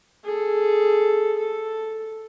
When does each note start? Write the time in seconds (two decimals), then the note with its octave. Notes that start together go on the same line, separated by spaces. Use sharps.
0.24 G#4 A4
1.39 A4